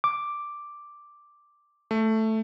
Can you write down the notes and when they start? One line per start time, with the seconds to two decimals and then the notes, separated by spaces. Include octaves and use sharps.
0.04 D6
1.91 A3